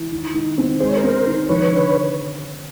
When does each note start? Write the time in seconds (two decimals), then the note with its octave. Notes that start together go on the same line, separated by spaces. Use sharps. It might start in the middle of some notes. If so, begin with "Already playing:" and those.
Already playing: E3
0.12 D#3
0.34 D#3
0.58 C4
0.80 G#3 C5
0.89 C#5
0.96 A#4 C5
1.04 C4
1.26 D#3
1.49 F3 B4 C#5
1.72 D3